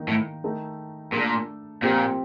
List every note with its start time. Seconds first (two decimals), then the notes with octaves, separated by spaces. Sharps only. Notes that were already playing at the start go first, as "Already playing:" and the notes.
Already playing: D#3 A#3 D#4
0.08 A2
0.44 D#3 A3 D#4 A4
1.12 A#2 A3 D4 A4
1.82 A#2 F3 C4 G4